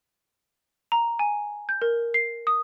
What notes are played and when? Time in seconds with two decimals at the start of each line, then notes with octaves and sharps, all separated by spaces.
0.92 A#5
1.19 G#5
1.69 G6
1.82 A#4
2.14 C7
2.47 D#6